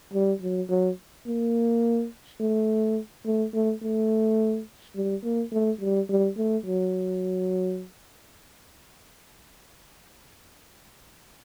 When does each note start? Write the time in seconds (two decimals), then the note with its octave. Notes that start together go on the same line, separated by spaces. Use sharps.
0.13 G3
0.42 F#3
0.70 F#3
1.27 A#3
2.40 A3
3.25 A3
3.53 A3
3.82 A3
4.95 G3
5.24 A#3
5.52 A3
5.81 G3
6.09 G3
6.37 A3
6.66 F#3